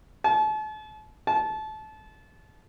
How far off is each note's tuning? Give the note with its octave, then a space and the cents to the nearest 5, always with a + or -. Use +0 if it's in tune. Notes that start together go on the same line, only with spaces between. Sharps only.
A5 -40
A5 -25